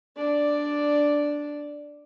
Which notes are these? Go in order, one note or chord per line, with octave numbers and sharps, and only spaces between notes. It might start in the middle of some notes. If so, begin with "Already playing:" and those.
D4 D5